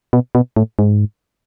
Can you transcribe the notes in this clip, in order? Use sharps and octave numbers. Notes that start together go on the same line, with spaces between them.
B2
B2
A2
G#2